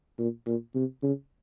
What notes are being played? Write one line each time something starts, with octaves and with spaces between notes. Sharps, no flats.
A#2
A#2
C3
C#3